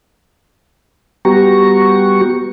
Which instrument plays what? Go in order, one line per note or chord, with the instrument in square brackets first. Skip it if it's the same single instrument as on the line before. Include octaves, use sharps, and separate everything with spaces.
[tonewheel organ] G3 B3 F#4 G4 A#5 C#6